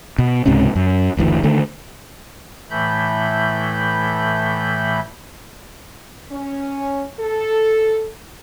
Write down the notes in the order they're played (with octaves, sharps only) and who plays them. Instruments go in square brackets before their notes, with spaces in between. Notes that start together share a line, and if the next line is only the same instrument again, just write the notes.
[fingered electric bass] B2
C#2 G#2 C3 C#4
F#2
F#1 D2 E3
D3 D#3 A3
[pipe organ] A2 E3 A3 B5 G6
[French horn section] C#4
A4